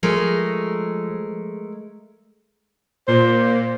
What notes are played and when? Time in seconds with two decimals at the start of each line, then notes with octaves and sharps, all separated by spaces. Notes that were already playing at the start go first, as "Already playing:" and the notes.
0.03 F3 G#3 A3 A#4
3.08 A#2 C5